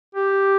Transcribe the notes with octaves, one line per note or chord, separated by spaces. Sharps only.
G4